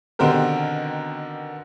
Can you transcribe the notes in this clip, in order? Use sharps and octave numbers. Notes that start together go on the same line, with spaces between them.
B2 D3 D#3 C4 G4 A#4